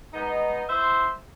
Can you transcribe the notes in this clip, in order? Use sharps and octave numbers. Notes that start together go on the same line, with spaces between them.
G#3 B3 D#4
E4 C5 E5 C6